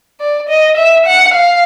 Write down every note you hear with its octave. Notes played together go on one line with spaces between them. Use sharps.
D5
D#5
E5
F#5
F5